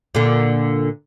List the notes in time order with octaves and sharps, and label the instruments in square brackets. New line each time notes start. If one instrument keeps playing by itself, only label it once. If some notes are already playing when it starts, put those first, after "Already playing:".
[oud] A#2 D3